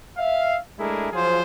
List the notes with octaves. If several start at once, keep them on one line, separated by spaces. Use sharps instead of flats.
E5 F5
G#3 A3 D4 E4 G#4 A#4
F3 F#3 F4 G#4 C5